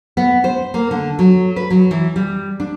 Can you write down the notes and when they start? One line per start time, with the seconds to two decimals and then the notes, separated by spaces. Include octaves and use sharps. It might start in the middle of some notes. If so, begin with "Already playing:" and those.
0.17 B3
0.44 C5
0.74 A#3
0.91 D3
1.19 F#3
1.56 B4
1.70 F#3
1.91 E3
2.16 G3
2.60 D4